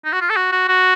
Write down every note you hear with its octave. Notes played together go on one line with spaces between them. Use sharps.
D#4
F#4
F4
A4
F#4
F#4
F#4